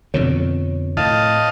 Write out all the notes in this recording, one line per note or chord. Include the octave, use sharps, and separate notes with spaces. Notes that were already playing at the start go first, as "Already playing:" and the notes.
F2 B2 D3 C#5
A2 D#5 F5 A5